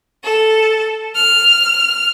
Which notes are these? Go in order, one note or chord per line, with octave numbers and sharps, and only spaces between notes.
A4
F6